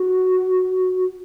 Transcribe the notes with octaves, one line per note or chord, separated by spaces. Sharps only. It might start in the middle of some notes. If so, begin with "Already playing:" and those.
Already playing: F#4